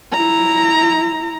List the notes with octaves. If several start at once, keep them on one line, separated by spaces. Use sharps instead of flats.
E4 A#5